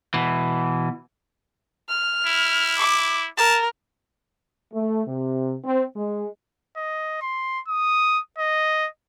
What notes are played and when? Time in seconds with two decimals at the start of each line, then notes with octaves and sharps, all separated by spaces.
0.14 B2 E3
1.89 F6
2.26 E4
2.78 D6
3.38 A#4 A5
4.73 A3
5.06 C3
5.63 C4
5.96 G#3
6.77 D#5
7.22 C6
7.68 D#6
8.38 D#5